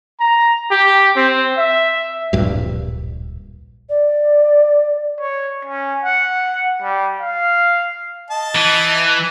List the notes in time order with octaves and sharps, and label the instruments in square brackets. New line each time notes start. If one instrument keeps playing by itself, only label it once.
[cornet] A#5
G4
C4
E5
[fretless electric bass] D1 A#1 G2
[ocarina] D5
[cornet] C#5
C#4
F#5
G3
F5
[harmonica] D#5 A5
[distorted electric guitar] E3